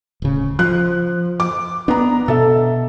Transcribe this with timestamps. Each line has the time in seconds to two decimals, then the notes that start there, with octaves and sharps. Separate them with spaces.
0.22 D1 C#3
0.59 F3 F#6
1.40 D6
1.88 B3 D4 A#5
2.28 B2 A4 E5